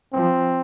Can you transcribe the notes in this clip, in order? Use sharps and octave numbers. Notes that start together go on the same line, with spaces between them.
F3 C4